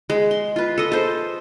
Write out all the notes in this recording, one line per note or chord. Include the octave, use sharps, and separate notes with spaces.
G#3
C6
F4 B4
A4 D#5
A4 C5